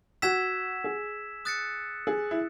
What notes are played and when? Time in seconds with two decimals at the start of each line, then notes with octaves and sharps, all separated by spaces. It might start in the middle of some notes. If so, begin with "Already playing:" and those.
0.22 F#4 E6 G#6 B6 E7
0.84 G#4
1.45 D#6 F#6 A6 C#7
2.07 G#4
2.31 E4